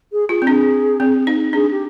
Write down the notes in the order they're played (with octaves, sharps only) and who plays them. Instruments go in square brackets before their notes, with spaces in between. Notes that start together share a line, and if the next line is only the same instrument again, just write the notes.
[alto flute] G#4
[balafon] F4 [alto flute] G#4
[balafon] C4
[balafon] D4 [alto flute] G#4
[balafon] C4
D#4
[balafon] D4 [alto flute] G#4
[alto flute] G4